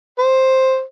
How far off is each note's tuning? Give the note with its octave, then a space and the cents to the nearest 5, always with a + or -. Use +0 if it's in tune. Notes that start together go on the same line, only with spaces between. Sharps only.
C5 +5